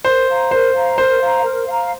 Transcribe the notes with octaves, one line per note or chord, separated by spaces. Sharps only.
A#4 C5
F5 A#5
A#4 C5
F5 A#5
A#4 C5
F5 A#5
A#4
F5 A#5